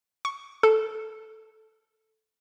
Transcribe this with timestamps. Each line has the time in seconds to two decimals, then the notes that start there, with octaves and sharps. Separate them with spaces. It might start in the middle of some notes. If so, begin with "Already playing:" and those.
0.25 C#6
0.63 A4